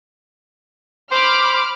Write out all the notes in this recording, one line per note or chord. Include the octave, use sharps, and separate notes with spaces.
C5 B5 D6 F6